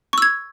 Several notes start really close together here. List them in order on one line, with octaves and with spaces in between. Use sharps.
C#6 E6 G#6